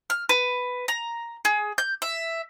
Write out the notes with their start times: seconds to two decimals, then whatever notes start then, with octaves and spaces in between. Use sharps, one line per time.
0.10 F6
0.29 B4
0.88 A#5
1.45 G#4
1.78 G6
2.02 E5